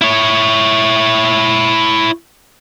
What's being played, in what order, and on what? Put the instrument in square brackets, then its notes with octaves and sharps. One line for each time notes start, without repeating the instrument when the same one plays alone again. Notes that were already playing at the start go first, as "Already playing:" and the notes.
[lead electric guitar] E4 C#5